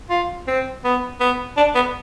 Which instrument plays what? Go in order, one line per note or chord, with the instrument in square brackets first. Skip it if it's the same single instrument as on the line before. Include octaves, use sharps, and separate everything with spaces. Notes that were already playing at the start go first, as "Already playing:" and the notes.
[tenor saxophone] F4
C4
B3
B3
D4
B3